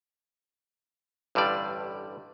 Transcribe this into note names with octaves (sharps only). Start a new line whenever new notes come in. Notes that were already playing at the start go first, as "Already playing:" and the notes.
A1 G2 D3 G3 D5